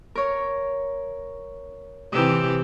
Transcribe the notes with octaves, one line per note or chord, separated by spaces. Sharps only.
A#4 C#5
C3 E3 G4 D#6 E6